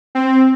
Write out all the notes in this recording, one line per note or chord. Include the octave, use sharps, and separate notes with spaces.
C4